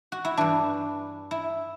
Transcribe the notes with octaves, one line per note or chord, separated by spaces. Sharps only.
F#4
E4
G2 E3 D4
E4